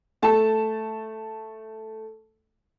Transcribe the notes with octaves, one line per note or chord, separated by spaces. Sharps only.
A3 A5